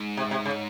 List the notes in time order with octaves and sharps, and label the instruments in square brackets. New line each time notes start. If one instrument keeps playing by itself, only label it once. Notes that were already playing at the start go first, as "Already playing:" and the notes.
Already playing: [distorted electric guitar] G#2
[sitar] C3
C3
C#3